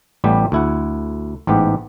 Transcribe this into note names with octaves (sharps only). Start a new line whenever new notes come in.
A1 A2 G3 B3 G4
D2 E4 F#5
A1 G#2 B3 G4